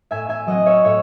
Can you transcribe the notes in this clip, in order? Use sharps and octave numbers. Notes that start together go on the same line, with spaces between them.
A2 E5 G#5
E5 G#5
F#3 C4 D#5 F#5
C#5 E5
A2 C#5 E5